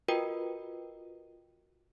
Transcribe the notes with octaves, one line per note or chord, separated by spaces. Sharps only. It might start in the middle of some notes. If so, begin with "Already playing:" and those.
F4 F#4 A#4 B4 D#5 G5